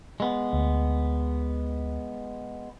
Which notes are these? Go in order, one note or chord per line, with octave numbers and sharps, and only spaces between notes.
G#3 B3
D2